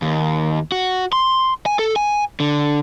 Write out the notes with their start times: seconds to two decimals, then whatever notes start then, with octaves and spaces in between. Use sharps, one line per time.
0.02 D#2
0.72 F#4
1.13 C6
1.66 G#5
1.79 A4
1.96 G#5
2.40 D3